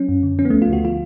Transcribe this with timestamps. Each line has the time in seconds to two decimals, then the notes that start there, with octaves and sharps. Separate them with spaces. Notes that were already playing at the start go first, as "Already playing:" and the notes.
Already playing: F#3 C#4
0.09 F#2
0.23 D3
0.39 F3 C#4
0.45 B3
0.50 A3
0.53 D2
0.62 F4
0.70 D3 F#4
0.84 F3 F4